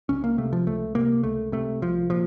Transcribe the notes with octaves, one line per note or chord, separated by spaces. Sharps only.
C#2 C#4
A#3
C3 A3
F3
C#2 A3
C3 A#3
C#2 A3
C3 A3
C2 F3
A#2 F3